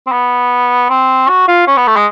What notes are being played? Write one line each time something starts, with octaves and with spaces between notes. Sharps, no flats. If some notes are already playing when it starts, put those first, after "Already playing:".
C4
B3
C4
F#4
F4
C#4
B3
A3
G#3